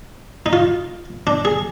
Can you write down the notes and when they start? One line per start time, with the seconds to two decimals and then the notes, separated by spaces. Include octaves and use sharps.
0.46 D#4
0.53 F4
1.27 D4
1.45 G#4